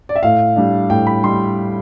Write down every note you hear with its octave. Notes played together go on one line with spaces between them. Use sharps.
D5
E5
A2 F5
G3 D4
A2 G5
B5
G3 C6